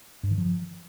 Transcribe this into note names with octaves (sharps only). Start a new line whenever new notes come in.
G2
D#3
F3